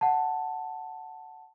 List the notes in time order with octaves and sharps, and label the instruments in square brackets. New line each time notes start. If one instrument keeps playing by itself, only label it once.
[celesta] F#5 A5